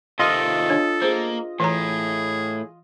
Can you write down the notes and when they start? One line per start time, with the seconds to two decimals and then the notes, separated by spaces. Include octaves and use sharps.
0.19 C3 D#3 F4 A4 D#5
0.69 D4 C#5
1.02 A#3 G#4 C5
1.60 A2 E3 G#4 C#5 A#5